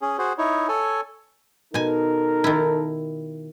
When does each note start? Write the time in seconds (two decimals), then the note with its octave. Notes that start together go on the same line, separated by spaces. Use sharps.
0.02 C#4 G#4
0.18 F#4 G#4 C5
0.38 D#4 E4 C#5
0.69 A4 C#5 G#5
1.74 B2 D#4 A4 A#4 G#5
2.44 D#3 E4